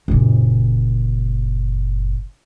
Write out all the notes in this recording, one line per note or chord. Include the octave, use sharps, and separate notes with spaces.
F#1 A#2